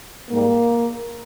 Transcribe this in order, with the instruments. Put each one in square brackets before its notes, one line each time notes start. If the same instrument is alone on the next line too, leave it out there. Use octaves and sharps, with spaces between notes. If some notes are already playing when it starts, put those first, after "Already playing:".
[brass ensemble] G#2 G3 A#3